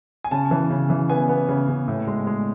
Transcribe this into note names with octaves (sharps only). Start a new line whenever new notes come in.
G#5
C#3 A5
E3
C#3
E3
B3 G#5
B3
C#3
C#3
A2
G#3
G#3